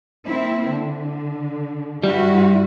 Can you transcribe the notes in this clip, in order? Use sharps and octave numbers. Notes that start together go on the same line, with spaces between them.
A#3 C4 E4
D3
G2 G3 E4 F#4